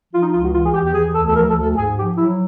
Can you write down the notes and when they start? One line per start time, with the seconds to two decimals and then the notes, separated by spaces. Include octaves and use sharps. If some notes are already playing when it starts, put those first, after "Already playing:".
0.13 F3 F4
0.22 D#4
0.33 C#2 F4
0.43 F#4
0.54 E3 F4
0.63 G#4
0.74 E2 G4
0.85 G4
0.94 E3 G#4
1.15 D2 A4
1.27 A4
1.36 F3 A#4
1.49 A4
1.56 D2
1.63 A4
1.76 G#2 G#4
1.97 F3 G4
2.17 F#3 E4